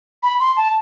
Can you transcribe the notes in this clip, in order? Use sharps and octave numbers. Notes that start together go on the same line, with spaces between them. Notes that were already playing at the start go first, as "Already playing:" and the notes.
B5
C6
A5